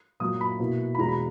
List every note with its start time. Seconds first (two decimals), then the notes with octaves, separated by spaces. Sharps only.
0.20 A#2 F#3 A#3 D#6
0.41 B5
0.59 B2 A#3 E4
0.95 B5
0.98 E2 B2 G#3 A#5
1.09 B5